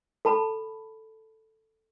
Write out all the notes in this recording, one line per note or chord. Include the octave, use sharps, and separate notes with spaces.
A4 A5 B5